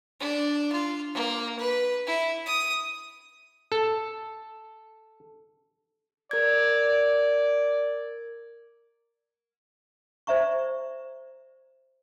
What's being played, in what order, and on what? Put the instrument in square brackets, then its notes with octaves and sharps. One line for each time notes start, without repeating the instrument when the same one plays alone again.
[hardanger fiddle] D4
F4
A#3
B4
E4
D#6
[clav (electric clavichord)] A4
[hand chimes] A#4 G#6 [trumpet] D5
[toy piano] C5 D5 E5 A#5 C#6